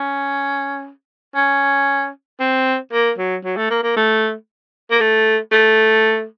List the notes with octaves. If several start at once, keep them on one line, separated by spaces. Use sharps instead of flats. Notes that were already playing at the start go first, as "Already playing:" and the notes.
Already playing: C#4
C#4
C4
A#3
F#3
F#3
A3
A#3
A#3
A3
A#3
A3
A3